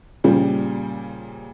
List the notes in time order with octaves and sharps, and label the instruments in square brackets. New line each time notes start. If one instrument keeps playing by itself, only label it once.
[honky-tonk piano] A#2 C#3 F3 G3